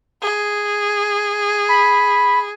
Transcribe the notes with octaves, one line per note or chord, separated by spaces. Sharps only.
G#4
B5